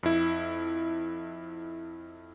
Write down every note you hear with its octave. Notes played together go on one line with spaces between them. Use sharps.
F2 E4